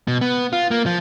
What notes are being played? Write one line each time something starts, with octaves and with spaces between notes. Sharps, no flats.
B2
B3
F4
A#3
F3